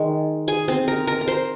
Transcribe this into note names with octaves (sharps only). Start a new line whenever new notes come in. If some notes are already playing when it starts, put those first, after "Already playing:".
Already playing: D#3 G#3
G#4 G#5
C4 C5
A#4 A#5
A#4 A#5
A#5
C5 C6